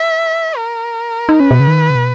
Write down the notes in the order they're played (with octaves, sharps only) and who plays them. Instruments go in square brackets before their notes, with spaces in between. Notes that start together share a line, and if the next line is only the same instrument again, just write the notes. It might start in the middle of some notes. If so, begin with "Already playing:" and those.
Already playing: [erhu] E5
A#4
[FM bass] D#4
[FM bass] C#4 [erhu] B4
[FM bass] B2
C#3
D#3
C#3
B2